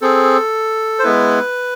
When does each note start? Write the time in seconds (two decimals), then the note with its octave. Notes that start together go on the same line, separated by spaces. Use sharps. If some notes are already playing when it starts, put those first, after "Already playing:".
0.02 C4 G#4 A4
0.99 C5
1.04 G#3 B3 E4 B4